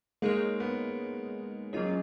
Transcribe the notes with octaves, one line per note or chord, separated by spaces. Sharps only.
G#3 A#3 D#4 G#4 C#5
B3
F#3 A#3 D#4 F4 G#4 C#5
C#4